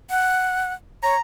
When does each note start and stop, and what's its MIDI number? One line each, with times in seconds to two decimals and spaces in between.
0.10 0.73 78
1.03 1.15 73
1.03 1.21 82